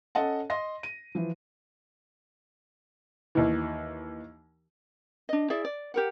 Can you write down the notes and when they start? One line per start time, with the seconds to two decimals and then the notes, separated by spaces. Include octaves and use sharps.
0.15 C#4 A4 D#5 F#5 A5
0.50 D#5 C6 A#6
0.83 D#7
1.15 E3 F3
3.35 D#2 E3
5.29 D4 D#5
5.50 E4 G#4 D5 E5
5.65 D5
5.94 G4 A#4 F#5